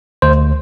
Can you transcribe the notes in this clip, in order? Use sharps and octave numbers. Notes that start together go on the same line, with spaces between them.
D2 C5